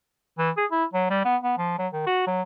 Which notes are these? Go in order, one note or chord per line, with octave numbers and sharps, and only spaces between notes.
E3
G#4
E4
F#3
G3
B3
B3
F3
F#3
D#3
F#4
F#3